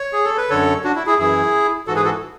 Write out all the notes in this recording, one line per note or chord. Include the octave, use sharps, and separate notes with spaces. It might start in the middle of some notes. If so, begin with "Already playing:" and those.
Already playing: C#5
G#4
A4
B4
F#2 D3 A4 C#5
D4 F#4
E4
E4 G#4
F#2 E3 E4 G#4
G#2 E3 F#4 A4
G#4 B4
F#4 A4